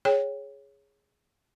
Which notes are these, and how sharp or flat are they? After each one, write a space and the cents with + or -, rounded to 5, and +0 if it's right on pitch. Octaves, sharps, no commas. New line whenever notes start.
G#4 +0 C#5 +0 G5 +10